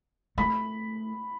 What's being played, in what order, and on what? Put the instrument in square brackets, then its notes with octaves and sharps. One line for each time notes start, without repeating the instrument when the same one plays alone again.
[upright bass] A3 [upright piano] B5